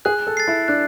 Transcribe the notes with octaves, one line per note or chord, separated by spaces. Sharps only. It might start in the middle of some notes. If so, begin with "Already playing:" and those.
G#4 F#6
A4
A6 C7
E4
D4 F#6